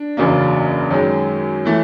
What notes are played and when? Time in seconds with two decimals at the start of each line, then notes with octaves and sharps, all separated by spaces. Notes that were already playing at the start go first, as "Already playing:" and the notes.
Already playing: D4
0.17 F#1 E2 C#3 F#3 A#3
0.90 F#2 D#3 G#3 C#4
1.65 E3 A3